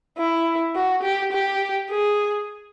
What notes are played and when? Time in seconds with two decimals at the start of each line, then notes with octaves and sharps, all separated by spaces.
0.18 E4
0.75 F#4
1.03 G4
1.32 G4
1.90 G#4